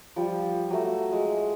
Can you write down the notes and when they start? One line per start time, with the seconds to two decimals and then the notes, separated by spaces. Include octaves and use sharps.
0.16 F3 G3
0.71 F#3 A3
1.13 G#3